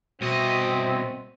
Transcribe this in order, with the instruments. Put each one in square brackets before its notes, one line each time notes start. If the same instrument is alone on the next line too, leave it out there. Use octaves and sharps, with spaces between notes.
[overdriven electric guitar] C2 D#5 [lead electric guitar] B2 [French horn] C4 [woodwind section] F#4 E5